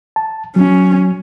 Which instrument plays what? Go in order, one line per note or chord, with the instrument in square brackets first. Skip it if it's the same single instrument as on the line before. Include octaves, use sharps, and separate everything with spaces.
[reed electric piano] A5
[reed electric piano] F#3 [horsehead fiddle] C#4